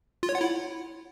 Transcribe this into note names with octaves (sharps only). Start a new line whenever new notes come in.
F4
C#5
F#5
E4